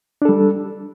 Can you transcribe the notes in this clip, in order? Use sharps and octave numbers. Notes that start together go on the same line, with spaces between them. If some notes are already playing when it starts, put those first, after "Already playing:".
G3 D4 A4